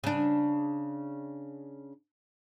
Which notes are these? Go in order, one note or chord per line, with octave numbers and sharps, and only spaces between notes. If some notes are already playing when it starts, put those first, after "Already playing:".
C#3 D4